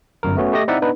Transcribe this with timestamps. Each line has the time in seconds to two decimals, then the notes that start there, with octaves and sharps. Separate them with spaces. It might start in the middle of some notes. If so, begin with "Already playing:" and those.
0.23 G1 F#2 A#4
0.37 A3 B3 C#4 F#4
0.53 A3 G4 D#5 A#6
0.68 C4 D#4 E4 D5 E5 F#5
0.82 B3 D4 D#4 B4